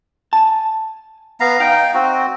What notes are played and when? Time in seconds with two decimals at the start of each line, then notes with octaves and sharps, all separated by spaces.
0.33 G#5 A5
1.40 B3 F5 A#5
1.60 D#4 F5 G5
1.94 C4 F#4